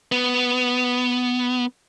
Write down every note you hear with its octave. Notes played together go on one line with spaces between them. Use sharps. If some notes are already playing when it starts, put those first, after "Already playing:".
B3